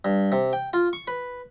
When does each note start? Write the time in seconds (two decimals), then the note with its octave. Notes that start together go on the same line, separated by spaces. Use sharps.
0.05 G2
0.32 C3
0.53 G5
0.73 F4
0.93 C#6
1.08 B4